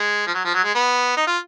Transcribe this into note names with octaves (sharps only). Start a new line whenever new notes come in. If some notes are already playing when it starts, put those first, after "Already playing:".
Already playing: G#3
F3
F#3
F3
F#3
G#3
B3
D#4
F4